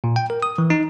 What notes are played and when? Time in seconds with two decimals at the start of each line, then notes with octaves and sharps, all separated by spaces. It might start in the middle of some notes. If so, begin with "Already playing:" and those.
0.04 A#2
0.16 G5
0.30 A#4
0.42 D#6
0.58 E3
0.70 D#4